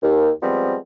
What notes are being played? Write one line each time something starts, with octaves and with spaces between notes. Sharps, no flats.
D#2
F3 G3 G#3 B3 C4